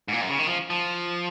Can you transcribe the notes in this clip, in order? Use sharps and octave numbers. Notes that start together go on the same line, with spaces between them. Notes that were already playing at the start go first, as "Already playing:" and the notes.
G#2
A#2
F#2
C#3
D#3
F3
F3